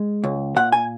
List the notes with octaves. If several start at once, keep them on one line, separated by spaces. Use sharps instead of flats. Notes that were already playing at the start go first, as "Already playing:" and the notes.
Already playing: G#3
C#2
A#2 F#5
G#5